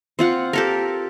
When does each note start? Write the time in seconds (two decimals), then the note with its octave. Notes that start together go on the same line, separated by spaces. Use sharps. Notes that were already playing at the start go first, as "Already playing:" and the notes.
0.19 C4 F4 F#5
0.53 G4 A4 A#4